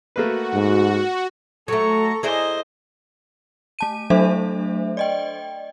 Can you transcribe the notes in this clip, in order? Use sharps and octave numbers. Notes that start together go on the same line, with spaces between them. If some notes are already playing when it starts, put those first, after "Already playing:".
A3 A#3 F#4 B4
G#2
F#3 A3 A4 A#5 C#6
E4 G#4 C5 D5 D#5
A3 A5 D#7
F#3 A3 D4 A4 C5 E5
D5 D#5 G5